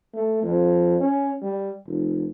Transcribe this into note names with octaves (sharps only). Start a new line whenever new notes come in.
A3
F2
C#4
G3
F1